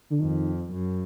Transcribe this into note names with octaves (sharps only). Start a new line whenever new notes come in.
D3
F2 D#3
F#2